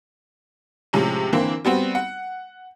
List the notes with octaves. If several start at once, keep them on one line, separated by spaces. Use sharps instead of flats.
A2 C3 F3 G#3 C#4
D3 E3 A#3 C4 E4
G3 B3 C4 F#4
F#5